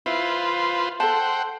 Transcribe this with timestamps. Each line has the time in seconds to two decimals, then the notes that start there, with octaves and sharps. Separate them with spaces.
0.06 E4 F4 B4 C5
1.00 A4 C5 F#5 G5 A5